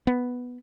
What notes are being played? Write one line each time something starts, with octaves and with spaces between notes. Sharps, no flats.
B3